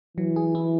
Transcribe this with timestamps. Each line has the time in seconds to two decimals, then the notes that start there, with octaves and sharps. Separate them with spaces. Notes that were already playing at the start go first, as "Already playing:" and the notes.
0.17 E3 F#3
0.36 G#4
0.55 E4